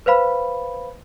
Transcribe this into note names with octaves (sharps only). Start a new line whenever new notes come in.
B4 C5 F5 B5